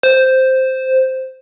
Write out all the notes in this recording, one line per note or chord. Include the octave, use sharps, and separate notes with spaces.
C5